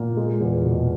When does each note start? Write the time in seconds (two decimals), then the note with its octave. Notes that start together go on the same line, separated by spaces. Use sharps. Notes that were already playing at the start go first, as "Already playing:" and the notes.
Already playing: A#2 A#3
0.17 G#3
0.41 E2
0.64 B2